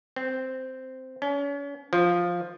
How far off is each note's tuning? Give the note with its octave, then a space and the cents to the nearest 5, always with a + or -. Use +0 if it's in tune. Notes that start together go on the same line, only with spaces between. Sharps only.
C4 -10
C#4 +35
F3 +5